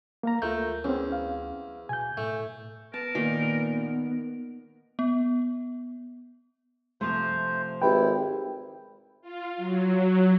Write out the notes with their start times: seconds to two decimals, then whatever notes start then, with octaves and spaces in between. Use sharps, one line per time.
0.23 A#3 F5 A#5
0.42 D2 A3 F4 A#4 G6
0.84 E2 C4 C#4
1.12 F5
1.89 B2 G#5 G6
2.17 A2 A3
2.94 B3 A#4 A5
3.15 A#2 D#3
4.99 B3
7.01 C3 F3 A3 C5
7.82 G#1 E4 G4 B4 G5
9.21 F4
9.57 F#3